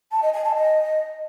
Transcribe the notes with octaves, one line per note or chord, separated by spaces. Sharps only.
A5
D#5
G#5
A5
D#5